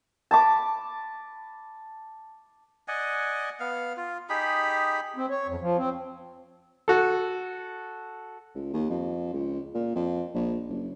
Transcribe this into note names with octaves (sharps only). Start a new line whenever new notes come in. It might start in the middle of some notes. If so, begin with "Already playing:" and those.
A5 B5 D6
D5 D#5 F#5 G#5
B3 F5
F4
D#4 G4 G#4 B5
C4
C#5
F2
F3
C4
F#4 A4
C#2
D#2
F2
C#2
A#2
F2
A#1
F#1